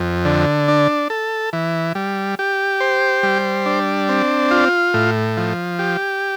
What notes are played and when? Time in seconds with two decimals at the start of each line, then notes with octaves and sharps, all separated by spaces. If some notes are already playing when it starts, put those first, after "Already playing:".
Already playing: F2
0.25 D3
0.68 D4
1.10 A4
1.53 E3
1.95 G3
2.39 G4
2.80 C5
3.23 G3
3.66 D4
4.09 C4
4.51 F4
4.94 A2
5.37 F3
5.79 G4